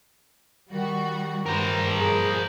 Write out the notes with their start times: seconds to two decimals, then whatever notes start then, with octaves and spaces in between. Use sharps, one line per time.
0.72 D#3 G3 F#4
1.46 G2 A#4 C5
2.00 G#4